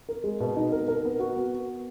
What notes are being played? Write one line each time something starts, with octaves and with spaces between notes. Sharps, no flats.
A#4
G#3
B2
D#4
A#4
A#4
B3
F#4
B3